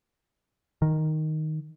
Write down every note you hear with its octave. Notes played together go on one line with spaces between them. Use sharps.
D#3